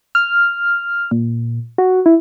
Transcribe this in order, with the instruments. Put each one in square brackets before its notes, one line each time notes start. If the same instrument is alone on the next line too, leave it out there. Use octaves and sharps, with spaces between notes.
[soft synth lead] F6
A#2
F#4
E4